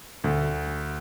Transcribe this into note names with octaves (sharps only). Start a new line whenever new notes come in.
D2